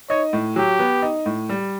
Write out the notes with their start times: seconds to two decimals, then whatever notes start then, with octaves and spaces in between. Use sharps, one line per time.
0.09 D#4 C#5
0.33 A2
0.56 F#3 G4
0.79 B3
1.02 D#4
1.26 A2
1.49 G3